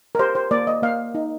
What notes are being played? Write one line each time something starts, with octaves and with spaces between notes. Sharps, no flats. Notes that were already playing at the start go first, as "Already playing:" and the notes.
A#4
G4 C5
C5
A#3 D5
D#5
A#3 F5
D#4